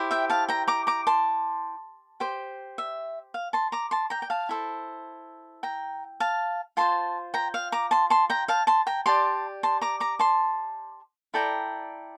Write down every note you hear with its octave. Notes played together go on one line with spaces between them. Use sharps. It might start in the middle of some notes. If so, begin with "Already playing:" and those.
Already playing: E4 G4 C5
E5 G5
F5 A5
G5 A#5
A#5 D6
A#5 D6
A5 C6
G4 C5
E5
F5
A5 C6
A#5 D6
A5 C6
G5 A#5
G5
F5 A5
E4 A4 C5
G5 A#5
F5 A5
F4 C5 A5 C6
G5 A#5
F5
A#5 D6
A5 C6
A5 C6
G5 A#5
F5 A5
A5 C6
G5 A#5
G4 D5 A5 C6
A5 C6
A#5 D6
A#5 D6
A5 C6
E4 A4 D5 G5 A#5